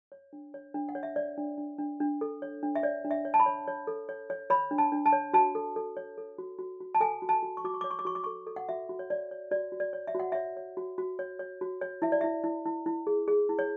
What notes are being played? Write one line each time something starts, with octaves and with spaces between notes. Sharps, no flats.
C#5
D4
C#5
D4
F#5
C#5
E5
C#5 D5
D4
D4
D4
D4
A4
C#5
D4
E5
C#5 D5
D4
E5
C#5
A5
B5
C#5
C#5
A4
C#5
C#5
C#5 B5
D4
A5
D4
A5
C#5
F#4 A5
A4
A4
C#5
A4
F#4
F#4
F#4
A5
A4 G#5
F#4
A5
F#4
C#6
F#4 D6
C#6
C#5 D6
C#6
D6
F#4 C#6
D6
A4 C#6
A4
F#5
F#4 E5
F#4
C#5
C#5 D5
C#5
F#4 D5
F#4
D5
C#5
E5
F#4 F#5
C#5 E5
C#5
F#4
F#4
C#5
C#5
F#4
C#5
E4 E5
D5
E4 E5
E4
E4
E4
G#4
G#4
E4
C#5